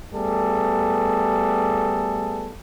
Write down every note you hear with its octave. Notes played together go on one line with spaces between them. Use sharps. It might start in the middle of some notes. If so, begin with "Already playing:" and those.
G3 A3 B3 G#4 A4